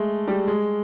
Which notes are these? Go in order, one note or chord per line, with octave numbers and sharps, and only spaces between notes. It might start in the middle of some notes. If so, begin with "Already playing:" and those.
Already playing: G#3 A3
G3
G#3